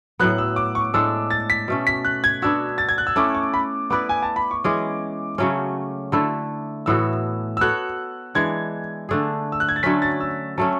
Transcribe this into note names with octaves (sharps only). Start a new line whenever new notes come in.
A2 F#3 B3 F#6
E6
D6
C#6
A2 G#3 D4 A4 E6
A6
B6
B2 A3 C#4
B6
F#6
G#6
B3 D4 F#4 E6
A6
G#6
F#6
E6
A3 C#4 E4 D6
C#6
B5
B3 E4 B4 D5 D6
G#5
A5
B5
C#6
E3 G#3 C#4 G#4 D6
C#3 F#3 A3 C#4
D3 A3 E4 A4
A2 E3 B3 F#4 E6
E6
B3 F#4 A4 C#5 F#6
E3 G#3 D4 G#6
D3 A3 D4 G#4
E6
F#6
G#6
A6
D3 F#3 A3 C#4 B6
A6
E6
F#3 A3 C#4 A5